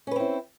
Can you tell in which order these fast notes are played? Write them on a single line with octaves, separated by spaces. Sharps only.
C#4 B4 C4 E4